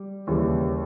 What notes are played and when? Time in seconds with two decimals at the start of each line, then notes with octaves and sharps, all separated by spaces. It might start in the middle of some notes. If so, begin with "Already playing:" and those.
Already playing: G3
0.27 D#2 C#3 E3 G3